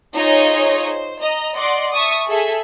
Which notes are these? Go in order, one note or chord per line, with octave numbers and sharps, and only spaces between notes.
D#4 F4 G#4 C5 C#5 D#5
C5
D#5 A#5
D5 D#5 F#5 C6 D6
E5 A5 C#6 D#6
G#4 A4 E5